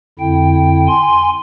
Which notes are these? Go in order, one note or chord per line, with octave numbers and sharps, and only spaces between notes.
F2 D3 E4 G5
G#5 C6